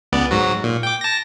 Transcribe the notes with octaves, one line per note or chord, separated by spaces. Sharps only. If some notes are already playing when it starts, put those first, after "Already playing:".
C#2 B3 D5
G#2 F#3 F#4
A#2
G5 D6
A5 A#6